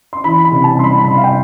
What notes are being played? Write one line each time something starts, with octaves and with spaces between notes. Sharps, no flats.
C6
E3 B5
B5
C3
A5
G3 C6
B5
C3 B5
F5
G5